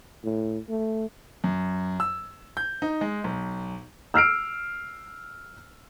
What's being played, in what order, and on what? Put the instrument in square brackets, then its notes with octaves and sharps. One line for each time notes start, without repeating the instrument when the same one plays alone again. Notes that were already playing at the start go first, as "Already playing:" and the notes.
[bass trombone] A2
A3
[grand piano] F#2
E6
G6
D#4
G#3
B1
[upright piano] E6 F6 C7 D7